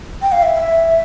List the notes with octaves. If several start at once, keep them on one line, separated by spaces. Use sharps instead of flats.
G5
F5
E5
E5